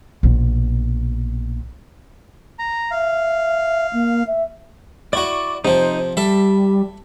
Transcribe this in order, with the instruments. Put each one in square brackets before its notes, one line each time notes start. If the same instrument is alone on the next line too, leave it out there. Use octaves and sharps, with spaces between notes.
[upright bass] A#1 B2
[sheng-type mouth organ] A#5
[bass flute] E5 [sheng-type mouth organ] F5
[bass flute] A#3
E5
[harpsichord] E4 F#4 [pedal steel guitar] D5 C#6
[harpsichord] C3 F3 [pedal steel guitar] D#4 C5
[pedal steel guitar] G3 [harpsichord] A4 E5